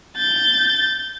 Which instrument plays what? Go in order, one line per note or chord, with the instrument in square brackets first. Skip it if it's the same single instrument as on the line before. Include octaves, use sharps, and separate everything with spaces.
[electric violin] G6 A6